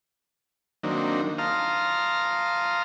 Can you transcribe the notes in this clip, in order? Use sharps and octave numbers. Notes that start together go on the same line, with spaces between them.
D#3 F#3 A#3 C4 D4 D#4
F5 A5 A#5 C6 D#6 F6